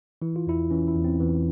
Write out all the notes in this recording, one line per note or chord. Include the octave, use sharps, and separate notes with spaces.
E3 E4
F4
E2 E4
E3 C#4
E4
E2
C4
E2 E3